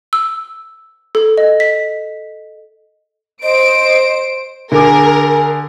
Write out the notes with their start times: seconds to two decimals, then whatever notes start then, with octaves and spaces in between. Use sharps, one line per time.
0.13 E6
1.15 A4
1.38 D#5
1.60 B6
3.43 C5 D#5 D7
4.72 D3 G#4 A#4 D6